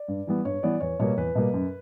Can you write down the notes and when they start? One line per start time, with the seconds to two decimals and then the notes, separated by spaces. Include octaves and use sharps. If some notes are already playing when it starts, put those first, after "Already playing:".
Already playing: D5
0.08 G2
0.27 E3 G3 B3
0.44 G2 C#5
0.63 E3 G3 B3 D5
0.81 E2 C#5
0.99 B2 G3 A#3 C#5
1.17 E2 B4
1.35 B2 G3 A#3
1.54 F#2